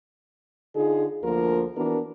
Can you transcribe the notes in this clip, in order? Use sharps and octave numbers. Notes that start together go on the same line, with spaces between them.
D3 D#4 F4 G#4
D2 D3 F3 A#3 F4 A#4
E3 B3 D4 F#4 A#4